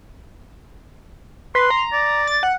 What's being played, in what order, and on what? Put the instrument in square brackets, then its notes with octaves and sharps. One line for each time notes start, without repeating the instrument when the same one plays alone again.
[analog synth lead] B4 [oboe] C6
[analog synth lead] A#5
[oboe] D5
[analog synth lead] A6
F#5